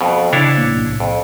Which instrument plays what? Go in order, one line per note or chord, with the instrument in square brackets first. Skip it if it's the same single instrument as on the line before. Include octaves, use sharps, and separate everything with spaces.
[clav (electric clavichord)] F2 B2
[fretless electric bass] C#3 [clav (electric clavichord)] D4 E4 C#5
[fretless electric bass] A1 A#3
B1 A2 C3
[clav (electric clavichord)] F2